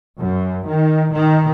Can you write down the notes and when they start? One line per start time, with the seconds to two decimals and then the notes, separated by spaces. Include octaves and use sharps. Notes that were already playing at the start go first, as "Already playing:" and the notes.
0.19 F#2
0.67 D#3
1.13 D#3